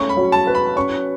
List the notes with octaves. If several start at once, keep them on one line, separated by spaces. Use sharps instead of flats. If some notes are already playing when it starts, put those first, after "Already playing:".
Already playing: A3 C#4 C#6
B5
F#3
A5
B4
B5
C#4 C#6